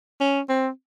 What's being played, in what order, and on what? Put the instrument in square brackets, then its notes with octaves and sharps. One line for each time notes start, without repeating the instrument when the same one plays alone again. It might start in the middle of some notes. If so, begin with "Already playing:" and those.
[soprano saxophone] C#4
C4